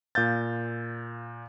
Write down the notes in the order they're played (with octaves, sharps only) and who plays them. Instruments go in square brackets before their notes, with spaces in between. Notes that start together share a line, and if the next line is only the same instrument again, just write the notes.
[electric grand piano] A#2 F5 G6 A6